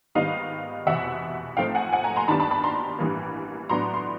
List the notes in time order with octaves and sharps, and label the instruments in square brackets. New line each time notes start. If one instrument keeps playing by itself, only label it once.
[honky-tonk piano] G#2 D#3 G3 B3 D#5 F5
F1 E2 B2 E5 F#5
G#2 F3 A3 C4 F5 G5
F#5 G#5
F#5 G#5
G#5 A#5
A#5 C6
G2 D#3 G3 B3 D4 A5 B5
A5 B5
A5 B5
A#5 C6
A1 G2 E3 G3 A#3
A2 F#3 B3 D4 A#5 C6
C6